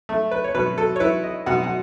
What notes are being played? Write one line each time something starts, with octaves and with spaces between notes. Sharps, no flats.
A3
B4
C#5
B2 B4
A4
C#5
E4 B4
D#5
B2 F#5
F#5